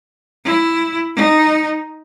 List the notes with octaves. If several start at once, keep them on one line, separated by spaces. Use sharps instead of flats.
E4
D#4